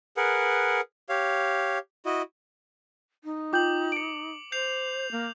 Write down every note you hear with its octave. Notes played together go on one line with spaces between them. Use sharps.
G#4 A#4 B4 F#5
G4 C#5 F5
E4 F#4 D#5
D#4
F4 G5 D6 G6 F#7
C#7 D7
C5 G6 C7 F7
A#3